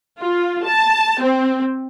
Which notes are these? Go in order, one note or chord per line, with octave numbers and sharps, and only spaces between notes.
F4
A5
C4